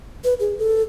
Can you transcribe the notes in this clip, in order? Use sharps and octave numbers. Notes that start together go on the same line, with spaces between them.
B4
G#4
A4